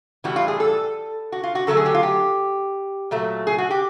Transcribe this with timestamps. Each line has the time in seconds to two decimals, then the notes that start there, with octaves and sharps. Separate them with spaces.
0.24 A2 E3 G3 F#4
0.36 F4
0.48 G#4
0.60 A4
1.32 F#4
1.43 F4
1.55 F#4
1.67 D3 F#3 A3 A4
1.77 G#4
1.86 G4
1.94 F4
2.03 G4
3.11 A#2 F#3 A3
3.47 G#4
3.58 F#4
3.71 G4